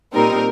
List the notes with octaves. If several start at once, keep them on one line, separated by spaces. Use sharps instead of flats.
A#2 G3 C4 D#4 A#4